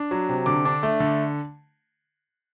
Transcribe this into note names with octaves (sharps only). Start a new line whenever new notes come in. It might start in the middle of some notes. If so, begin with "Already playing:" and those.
Already playing: D4
F#3
C3
D3 D6
D4
A3
D3